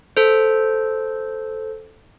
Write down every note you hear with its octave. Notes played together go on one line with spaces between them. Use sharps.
A4 C5